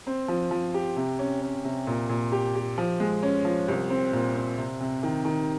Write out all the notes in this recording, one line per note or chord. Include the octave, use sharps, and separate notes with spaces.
C4
F3
F3
G4
C3
C#4
C#4
C3
A#2
A#2
G4
G4
F3
G#3
C#4
F3
C2
C4
A#2
C4
C3
C3
D#3
D#3